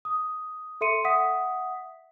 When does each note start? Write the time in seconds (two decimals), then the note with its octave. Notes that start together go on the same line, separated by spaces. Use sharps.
0.05 D#6
0.81 A4 E5 C6 C#7 D#7
1.04 E5 F#5 D#6 B6